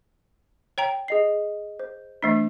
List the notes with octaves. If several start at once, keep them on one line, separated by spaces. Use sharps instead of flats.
C#5 G5 A#5
G#4 D#5 C7
C5
E3 A3 D4